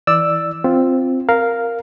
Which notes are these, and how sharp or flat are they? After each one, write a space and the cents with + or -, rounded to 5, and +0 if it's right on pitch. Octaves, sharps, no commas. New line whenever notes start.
E3 -5 D5 +5 E6 +0
C4 +0 F4 +0
A#4 +0 F5 +0